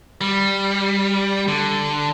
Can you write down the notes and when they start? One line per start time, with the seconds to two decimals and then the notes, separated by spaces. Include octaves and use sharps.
0.21 G3
1.48 D3